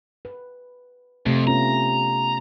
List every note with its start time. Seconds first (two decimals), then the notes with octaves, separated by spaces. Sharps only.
0.25 B4
1.26 F2 C3 A3
1.47 B3 C#4 F4 A#5